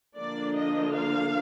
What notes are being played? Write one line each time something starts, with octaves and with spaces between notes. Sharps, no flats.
D3 F3 A#3 D4 D5
D#5
F5